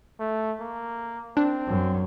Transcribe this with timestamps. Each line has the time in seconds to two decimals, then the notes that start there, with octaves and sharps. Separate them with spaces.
0.20 A3
0.60 A#3
1.37 C4 D4
1.67 F#2